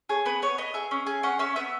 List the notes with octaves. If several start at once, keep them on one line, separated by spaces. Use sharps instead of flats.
G#4 C#5
B3 B4
B3 C#5
B3 D#5
G#4 E5
C#4
G#4
C#4 F#5
C#4 E5
B3 E5